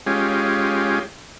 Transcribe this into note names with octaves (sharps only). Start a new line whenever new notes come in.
G#3 C#4 F4 G4